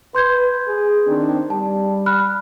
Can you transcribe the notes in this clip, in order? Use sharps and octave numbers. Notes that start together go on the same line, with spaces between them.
B4 C6 G6 G#6
G#4
D#3 C4 D4
G3 A5
B5 F6 F#6